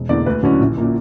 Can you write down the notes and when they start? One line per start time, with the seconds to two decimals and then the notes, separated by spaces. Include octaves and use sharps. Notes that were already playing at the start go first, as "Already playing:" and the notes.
Already playing: E1
0.09 E2 D3 A#3 D5
0.26 D2 B4
0.43 D3 F#3 C#4 E4
0.60 A#1
0.77 A#2 A#3